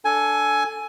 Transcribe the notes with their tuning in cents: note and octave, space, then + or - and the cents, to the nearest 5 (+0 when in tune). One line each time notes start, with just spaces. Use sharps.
D4 +0 A4 +0 G#5 +15